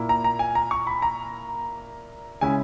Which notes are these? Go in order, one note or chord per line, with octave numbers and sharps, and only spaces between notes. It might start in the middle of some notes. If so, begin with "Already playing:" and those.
Already playing: A#2 A#3 E4
A#5
A#5
G#5
A#5
C#6
B5
A#5
C#3 G#3 C#4 E4 G#5